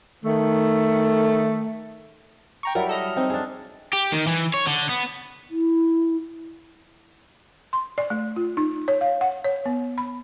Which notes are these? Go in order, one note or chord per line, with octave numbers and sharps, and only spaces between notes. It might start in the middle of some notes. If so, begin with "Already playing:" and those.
D#3 A3
G5 A#5 C#6
F#3 G3 E4 A#4
A4 D#5 F6
C4 D#4
D4 G#4
G4
D#3
E3
C#5
D3
B3
E4
C6
D5
A3
F4
D#4
C#5
F5
F#5
C#5
B3
B5